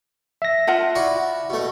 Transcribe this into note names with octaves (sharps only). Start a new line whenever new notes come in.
E5 A#6
F4 F#5 A5
E4 F#4 D5
B2 A3